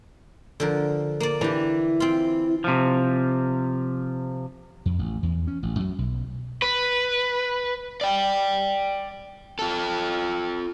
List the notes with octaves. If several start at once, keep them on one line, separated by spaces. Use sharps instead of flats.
D3 F3 A#4
A#3 D5
E3 D4 G4
C4 F4
C3 F3
F2
A1
E2
C#4
A1
F#2
B1
B4
D5 G5
F4 A4